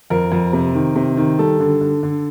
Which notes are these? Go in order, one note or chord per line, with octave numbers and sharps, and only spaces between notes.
F2 A#4
F2
C3
D#3
C3
D#3
G3 A4
D3
D3
D3